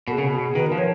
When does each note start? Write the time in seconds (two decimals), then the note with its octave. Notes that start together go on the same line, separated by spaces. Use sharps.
0.08 B2 A#4
0.12 G#4
0.18 C#3
0.28 B2
0.55 D#3 B4
0.66 A#4
0.72 F3
0.78 C#5